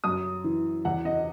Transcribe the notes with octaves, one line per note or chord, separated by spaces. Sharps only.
F#2 D#6
E3
E2 F#5
D#5